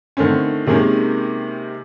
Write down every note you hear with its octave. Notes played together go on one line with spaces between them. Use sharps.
D3 D#3 A3 C4 C#4
C3 D#3 G#3 A#3 C#4